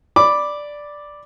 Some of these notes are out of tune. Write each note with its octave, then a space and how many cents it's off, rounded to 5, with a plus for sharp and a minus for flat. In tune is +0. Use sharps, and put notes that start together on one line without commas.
D5 +0 B5 +0 D6 +0